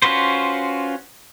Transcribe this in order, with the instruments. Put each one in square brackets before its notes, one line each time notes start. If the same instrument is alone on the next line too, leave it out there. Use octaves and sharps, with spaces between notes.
[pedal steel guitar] C#4 F4 F#4 B4 C5